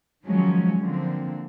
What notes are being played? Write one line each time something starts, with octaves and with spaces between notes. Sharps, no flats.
D#3 F3 F#3 G#3 C#4
D3 F3 A#3 C4